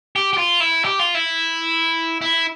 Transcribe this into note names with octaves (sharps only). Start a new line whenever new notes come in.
G4
G4
F4
E4
G4
F4
E4
E4